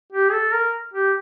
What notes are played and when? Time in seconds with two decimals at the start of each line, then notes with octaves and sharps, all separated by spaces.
0.12 G4
0.32 A4
0.53 A#4
0.93 G4